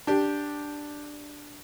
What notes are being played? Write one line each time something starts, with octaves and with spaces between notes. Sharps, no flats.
D4 G4